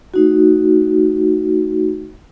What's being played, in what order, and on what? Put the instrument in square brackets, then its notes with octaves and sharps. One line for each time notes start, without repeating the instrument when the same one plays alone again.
[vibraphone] A3 D#4 F#4